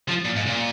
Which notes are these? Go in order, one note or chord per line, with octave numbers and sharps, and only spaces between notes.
F3
A#2
G#2
A#2